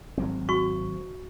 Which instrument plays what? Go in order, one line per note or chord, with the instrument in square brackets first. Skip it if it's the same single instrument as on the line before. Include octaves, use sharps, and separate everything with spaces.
[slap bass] G#1 F#3 C4
[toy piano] F#4 C#6